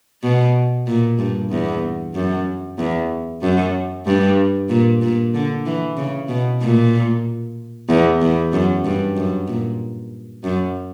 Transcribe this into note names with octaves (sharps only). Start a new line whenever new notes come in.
B2
A#2
G2
E2
F#2
E2
F#2
G2
A#2
A#2
D3
E3
C#3
B2
A#2
E2
E2
F#2
G2
F#2
A#2
F#2